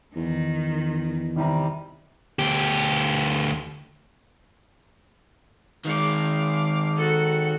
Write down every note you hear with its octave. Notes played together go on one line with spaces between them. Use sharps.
E2 D#3
C3 D#3 G3 A#5
D2 G4
D#3 G#3 F5 D6
F#4 A4